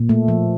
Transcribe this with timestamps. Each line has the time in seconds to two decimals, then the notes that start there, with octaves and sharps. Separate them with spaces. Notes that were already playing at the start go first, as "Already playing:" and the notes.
Already playing: A#2
0.09 A3
0.28 F3